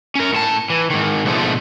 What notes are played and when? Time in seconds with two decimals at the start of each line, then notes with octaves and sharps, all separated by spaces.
0.15 C#4 A#4
0.33 A2 A5
0.70 E3
0.90 G#2 D#3
1.25 G#2 B2 D3 F3 G#3 A3